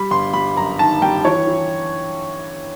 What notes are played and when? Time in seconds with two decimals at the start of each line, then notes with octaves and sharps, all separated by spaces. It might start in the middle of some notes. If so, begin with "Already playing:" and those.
Already playing: G3 B5
0.11 G1 C6
0.33 G3 B5
0.56 F#2 A#5
0.79 D#3 A5
1.02 G3 G5
1.25 E3 C#5
1.47 E3